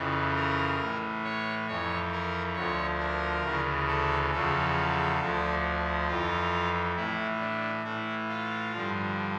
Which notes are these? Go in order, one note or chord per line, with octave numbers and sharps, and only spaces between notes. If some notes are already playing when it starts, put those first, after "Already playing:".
Already playing: F2 C#3 E3
A#4
A2 E3
C#5
F2 E3 C#5
A#4
D2 D3 F3 C#5
A#4
D2 C#3 E3
A4
E2 C#3 F3 A4
D2 D3 F3
F2 E3 F4
A2 E3 E4
D4
A2 E3 E4
F4
G2 D3 F3